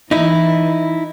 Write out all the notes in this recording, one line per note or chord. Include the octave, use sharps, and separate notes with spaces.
E3 D#4 E4